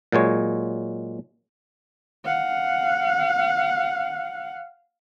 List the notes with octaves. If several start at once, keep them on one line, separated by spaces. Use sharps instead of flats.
A#2 F#3 G#3 C#5
F5 F#5